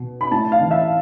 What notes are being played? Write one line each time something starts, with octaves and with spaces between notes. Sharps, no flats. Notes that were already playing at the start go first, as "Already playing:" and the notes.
Already playing: B2
B5
A2 A5
F5
E3
E5